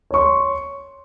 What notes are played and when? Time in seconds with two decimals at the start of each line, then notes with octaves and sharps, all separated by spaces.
0.11 C#5
0.14 C#6
0.17 C6